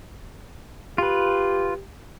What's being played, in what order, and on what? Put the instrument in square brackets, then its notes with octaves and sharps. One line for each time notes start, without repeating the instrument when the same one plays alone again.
[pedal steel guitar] F4 B4 [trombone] G4